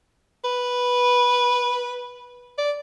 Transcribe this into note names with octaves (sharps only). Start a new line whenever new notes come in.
B4
D5